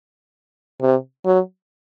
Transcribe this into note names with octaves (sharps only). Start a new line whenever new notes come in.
C3
F#3